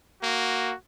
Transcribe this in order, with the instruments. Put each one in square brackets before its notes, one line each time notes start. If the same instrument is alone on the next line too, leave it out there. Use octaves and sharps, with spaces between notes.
[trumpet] A#3 [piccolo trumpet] F#4